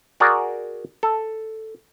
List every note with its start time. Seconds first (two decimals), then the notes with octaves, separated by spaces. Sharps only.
0.20 F#4 G#4 A#4 D5
1.03 A4